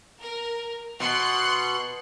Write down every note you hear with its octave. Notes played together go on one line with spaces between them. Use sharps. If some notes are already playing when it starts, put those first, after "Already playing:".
A#4
B2 C6 F#6 C#7